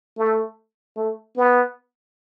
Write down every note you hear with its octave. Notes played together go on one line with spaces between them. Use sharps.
A3
A3
B3